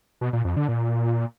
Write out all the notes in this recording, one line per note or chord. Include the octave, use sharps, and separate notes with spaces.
B2
A#2
F2
D3
A#2